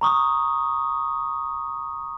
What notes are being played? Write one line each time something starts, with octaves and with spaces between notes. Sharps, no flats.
A#5 C#6 D#6